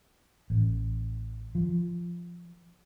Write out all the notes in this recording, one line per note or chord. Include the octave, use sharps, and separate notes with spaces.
A1
F3